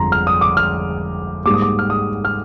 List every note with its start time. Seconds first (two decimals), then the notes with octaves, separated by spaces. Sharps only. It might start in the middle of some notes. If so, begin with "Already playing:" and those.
Already playing: G1 F2 D3 F3 G#3 A#5 C6
0.12 F6
0.27 D#6
0.41 D6
0.57 F6
1.46 G#2 G3 A#3 D6
1.54 D#6
1.62 D6
1.79 F6
1.90 D#6
2.25 F6